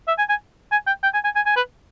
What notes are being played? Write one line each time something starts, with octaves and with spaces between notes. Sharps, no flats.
E5
G#5
G#5
G#5
G5
G5
G#5
G#5
G#5
G#5
B4